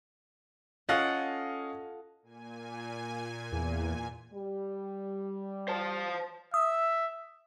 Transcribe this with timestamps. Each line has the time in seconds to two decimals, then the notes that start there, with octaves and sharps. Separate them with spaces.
0.89 C#4 F4 A4 D#5 F5 F#5
2.22 A#2 G#5
3.52 E2
4.33 G3
5.68 C5 A5
6.54 E5 D#6